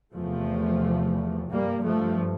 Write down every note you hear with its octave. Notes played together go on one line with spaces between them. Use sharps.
E2 C3 F3 A3
G2 G3 A#3
F3 A3